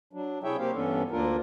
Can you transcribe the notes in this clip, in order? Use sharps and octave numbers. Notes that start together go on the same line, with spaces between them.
F#3 D4
C3 E4 G#4 C#5 E5 G5
A#3 C4 G4 C5 F5
G2 E3 B3 C#4 D4 A4
D2 A#3 D4 F4 A#4